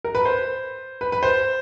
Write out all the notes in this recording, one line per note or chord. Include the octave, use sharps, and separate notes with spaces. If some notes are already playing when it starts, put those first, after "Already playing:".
A#4
B4
C5
B4
B4
C5